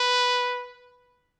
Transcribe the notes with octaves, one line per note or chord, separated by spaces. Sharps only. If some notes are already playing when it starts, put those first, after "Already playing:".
Already playing: B4